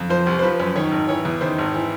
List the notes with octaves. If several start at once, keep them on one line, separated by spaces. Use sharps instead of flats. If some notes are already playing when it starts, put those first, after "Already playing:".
Already playing: F2
F3 C5
C2
C5
F3 B4
F#2
D#3 C#5
G#1
E3 C#5
E2
D#3 C5
G#1
E3